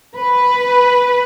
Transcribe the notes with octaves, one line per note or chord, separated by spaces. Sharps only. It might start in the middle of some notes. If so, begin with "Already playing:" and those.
B4